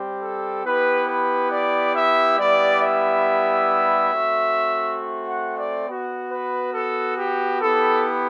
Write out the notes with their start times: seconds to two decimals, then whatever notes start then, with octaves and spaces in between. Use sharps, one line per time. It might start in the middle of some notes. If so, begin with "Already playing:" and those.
Already playing: G3 C4 G4
0.22 A4
0.65 B3 E4 G4 B4
1.09 B4
1.52 D5
1.96 E5
2.39 G3 B3 E4 G4 D5
2.83 E5
4.13 A3 C4 F#4
5.29 F#5
5.58 D5
5.88 B3 F#4
6.32 B4
6.74 A4
7.18 G4
7.61 B3 E4 G4 A4